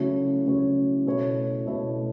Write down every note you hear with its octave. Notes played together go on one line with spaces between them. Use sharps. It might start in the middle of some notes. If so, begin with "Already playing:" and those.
Already playing: C#3 F#3 A3 E4 C#5
C#3 F#3 A3 E4 C#5
B2 A3 E4 C#5
B2 A3 E4 C#5